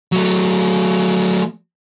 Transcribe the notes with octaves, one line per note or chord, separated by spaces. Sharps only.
F#3 A3